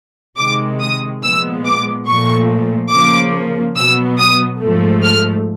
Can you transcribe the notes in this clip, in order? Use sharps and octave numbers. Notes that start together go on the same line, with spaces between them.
C3 D#3 G#3 D6
D#6
A#2 F3 G#3 B3 E6
D6
A#2 F3 A3 C#6
C#3 F3 A#3 D6
B2 F#3 B3 E6
D#6
G#2 F3 A3
F6